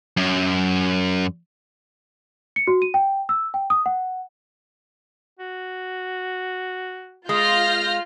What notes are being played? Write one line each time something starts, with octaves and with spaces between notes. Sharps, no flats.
F#2
C#7
F#4
D#7
G5
E6
G5
D#6
F#5
F#4
G#3 F4 F6 G6 A#6